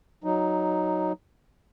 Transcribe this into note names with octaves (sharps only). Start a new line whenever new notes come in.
F#3 D#4